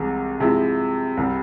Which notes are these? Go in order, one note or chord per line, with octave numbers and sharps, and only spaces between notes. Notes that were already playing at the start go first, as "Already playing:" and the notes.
Already playing: C2 C3 E3 G#3
C3 F3 G#3 E4
C2 C3 G3